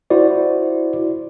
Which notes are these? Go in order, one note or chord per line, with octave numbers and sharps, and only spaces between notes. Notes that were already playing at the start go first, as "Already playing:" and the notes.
E4 F#4 C5 D5